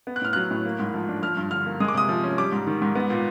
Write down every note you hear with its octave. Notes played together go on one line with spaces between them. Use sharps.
B3
F#6
A2 F6
F#3 F#6
A2
A#3
G#2
F3
D4
F3 F6
G2
D3 F6
A#3
G#3 D#6
D6
C3 D#6
F3
C#4
G3 D6
G#2
D#3
G#2
B3
A#2